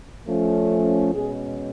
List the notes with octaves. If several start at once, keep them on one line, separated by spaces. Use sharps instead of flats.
F3 A3 C#4
B2 G#3 C#4 G#4